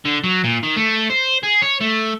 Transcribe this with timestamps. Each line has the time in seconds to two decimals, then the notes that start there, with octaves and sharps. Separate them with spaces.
0.05 D3
0.24 F#3
0.44 A#2
0.63 D#3
0.77 A3
1.10 C5
1.43 G#4
1.62 C#5
1.80 A3